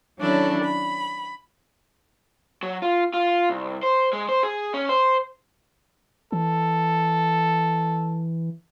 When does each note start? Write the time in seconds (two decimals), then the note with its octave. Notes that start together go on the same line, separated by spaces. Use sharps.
0.19 D#3 F#3 C#4 D4 E4 A4
0.64 B5
2.63 F#3
2.82 F4
3.14 F4
3.50 C2
3.83 C5
4.13 G#3
4.29 C5
4.43 G#4
4.74 C#4
4.89 C5
6.32 E3 A4